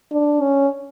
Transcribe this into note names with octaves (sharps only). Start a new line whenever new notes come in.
D4
C#4